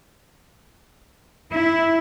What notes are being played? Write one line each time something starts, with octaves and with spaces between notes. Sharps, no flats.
E4